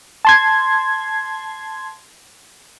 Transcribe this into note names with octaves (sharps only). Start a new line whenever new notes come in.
A5 C6 G#6